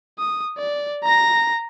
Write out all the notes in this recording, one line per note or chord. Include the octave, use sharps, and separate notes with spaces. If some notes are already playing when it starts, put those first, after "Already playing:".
D#6
D5
A#5 A#6